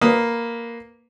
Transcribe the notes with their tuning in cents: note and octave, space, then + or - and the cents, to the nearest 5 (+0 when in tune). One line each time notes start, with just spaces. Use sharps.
A#3 +0 B4 +0 D#6 +0